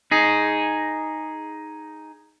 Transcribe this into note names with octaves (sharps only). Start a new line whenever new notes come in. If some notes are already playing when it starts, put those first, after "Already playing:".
D#4 G#4